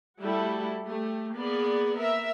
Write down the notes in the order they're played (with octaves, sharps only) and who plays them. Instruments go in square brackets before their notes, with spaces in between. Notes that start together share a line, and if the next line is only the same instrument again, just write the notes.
[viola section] G3 A3 E4 F#4 A4
A3 G4
A#3 B3 G#4 D5
A#4 E5